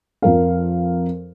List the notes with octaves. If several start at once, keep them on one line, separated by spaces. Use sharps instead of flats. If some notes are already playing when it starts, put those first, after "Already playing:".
F2 A#4 F5